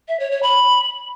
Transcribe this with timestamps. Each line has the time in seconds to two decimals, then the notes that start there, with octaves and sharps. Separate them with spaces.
0.08 E5
0.20 C#5
0.31 C#5
0.43 B5